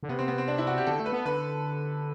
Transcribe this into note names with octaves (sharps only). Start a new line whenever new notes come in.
D3
C3 B3
C4
B3
C4
D4
E4
F#4
G4
D3 A4
A3
B4
B3
D3 B4